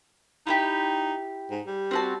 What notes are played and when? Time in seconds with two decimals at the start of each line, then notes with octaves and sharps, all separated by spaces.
0.47 D#4 E4 F#4 G4
1.51 G#2
1.67 G3
1.91 C4 F#4 A5